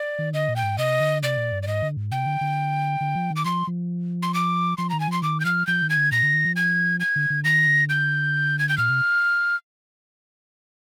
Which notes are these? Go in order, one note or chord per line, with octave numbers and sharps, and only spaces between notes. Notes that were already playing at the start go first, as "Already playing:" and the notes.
Already playing: D5
D#3
D3 D#5
A#2
G5
G#2
C3 D#5
D3
C3 D5
A#2
G2
D5
G#2 D#5
D3
G#2
C3 G5
D3
D3
D3
F3
D#3
D6
F3 C6
F3
C6
D6
F3 C6
D#3 A#5
G#5
F3 C6
D#3 D6
G6
F3 F6
F3 G6
D#3
G#6
D3
A#2 A#6
D3
D#3
F3
G#6
G#6
D3
D3
D#3 A#6
D3
G6
G#6
G6
A#2 F6
C3